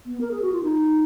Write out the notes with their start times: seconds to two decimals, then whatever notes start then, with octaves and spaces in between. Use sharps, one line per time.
0.06 B3
0.21 A#4
0.31 G#4
0.42 F#4
0.52 F4
0.63 D#4